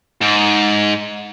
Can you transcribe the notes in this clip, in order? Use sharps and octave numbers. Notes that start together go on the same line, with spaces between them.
G#2